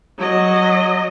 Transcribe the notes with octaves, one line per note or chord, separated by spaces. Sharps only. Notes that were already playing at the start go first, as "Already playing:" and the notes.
F#3 D#5